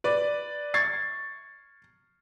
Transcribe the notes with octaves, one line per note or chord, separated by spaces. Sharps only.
B4 D5
C#6 G#6 A6 C7